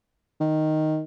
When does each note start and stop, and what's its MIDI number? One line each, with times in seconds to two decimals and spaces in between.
0.40 1.02 51